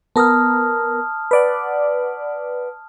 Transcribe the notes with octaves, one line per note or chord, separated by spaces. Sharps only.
B3 A#4 A5 D#6 F6
B4 D5 F#5